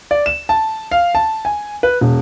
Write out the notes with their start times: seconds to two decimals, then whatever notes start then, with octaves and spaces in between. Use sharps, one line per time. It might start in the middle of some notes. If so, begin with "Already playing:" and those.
0.11 D5
0.26 E7
0.49 A5
0.92 F5
1.15 A5
1.45 G#5
1.83 B4
2.01 E1